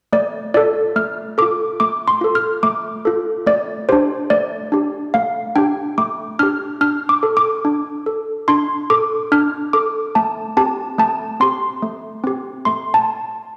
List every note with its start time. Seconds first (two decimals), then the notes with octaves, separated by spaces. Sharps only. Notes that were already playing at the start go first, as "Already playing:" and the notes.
0.13 A3 D5
0.54 F4 A4 D5
0.96 A3 F6
1.38 F4 A4 D6
1.80 A3 D6
2.08 C6
2.21 F4 A4
2.35 F6
2.63 A3 D6
3.05 F4 A4
3.47 A3 D5
3.89 D4 G4 C5
4.30 A3 D5
4.72 D4 G4
5.14 A3 F5
5.56 D4 G4 G5
5.98 A3 D6
6.39 D4 G4 F6
6.81 D4 F6
7.09 D6
7.23 A4
7.37 D6
7.65 D4
8.06 A4
8.48 D4 C6
8.90 A4 D6
9.32 D4 F6
9.73 A4 D6
10.15 A3 A5
10.57 C4 G4 A5
10.98 A3 A5
11.40 C4 G4 C6
11.82 A3
12.24 C4 G4
12.65 A3 C6
12.94 A5